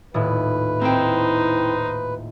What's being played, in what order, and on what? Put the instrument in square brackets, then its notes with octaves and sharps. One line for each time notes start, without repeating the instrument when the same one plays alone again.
[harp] D#1 A2 [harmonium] B4
[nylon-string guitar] C4 E4 G5 [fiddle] D#4 C5